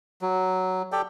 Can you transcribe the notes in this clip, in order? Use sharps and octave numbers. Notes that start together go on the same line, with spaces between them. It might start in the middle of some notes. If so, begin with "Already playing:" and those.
F#3
G4 A4 D5 G5